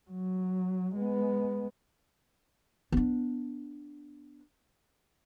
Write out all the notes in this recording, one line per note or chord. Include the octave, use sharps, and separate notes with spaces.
F#3
G#3 B3
B3 D4